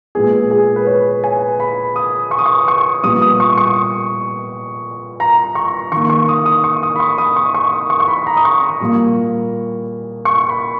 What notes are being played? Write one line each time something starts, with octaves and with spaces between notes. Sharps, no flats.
A#2 G#3 B3 G#4
G#4
B4
C#5
G#5
B5
D#6
C#6
D#6
C#6
C#6
A#2 G3 B3 D#6
D#6
C#6
C#6
A#5
C#6
D#3 A#3 C#6
C#6
D#6
D#6
C#6
D#6
B5
C#6
D#6
C#6
C#6
D#6
C#6
C#6
B5
A#5
D#6
C#6
A#2 G3 A#3
C#6
B5